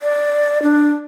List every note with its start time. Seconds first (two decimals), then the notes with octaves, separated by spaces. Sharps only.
0.01 D5
0.63 D4